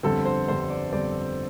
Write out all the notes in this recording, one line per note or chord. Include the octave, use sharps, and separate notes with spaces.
G1 F2 D3 G3 C4 A4
C5
G1 F2 D3 G3 C4 C5
D5
G1 F2 D3 G3 C4 D5